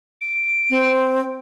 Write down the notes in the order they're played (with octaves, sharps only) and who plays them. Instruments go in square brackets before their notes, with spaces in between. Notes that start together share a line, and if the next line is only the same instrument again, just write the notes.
[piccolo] D7
[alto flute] C4